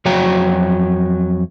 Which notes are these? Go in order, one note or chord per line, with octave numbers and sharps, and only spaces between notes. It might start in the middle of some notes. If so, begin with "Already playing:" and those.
F2 F#3 F#4 C#5 G5 A#5